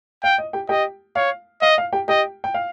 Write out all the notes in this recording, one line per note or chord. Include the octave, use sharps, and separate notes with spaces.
F5 G5
D#5
G4 G5
G4 D#5 G5
C#5 F5
D#5 F5
F5
G4 G5
G4 D#5 G5
G5
F5